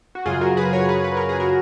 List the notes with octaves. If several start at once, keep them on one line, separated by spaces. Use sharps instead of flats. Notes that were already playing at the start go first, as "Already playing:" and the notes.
F#4
F#2 C#3 F#3 F4 G#4
F#4 A#4
G#4 B4
A#4 C#5
G#4 B4
B4
A#4
G#4
F#4 A#4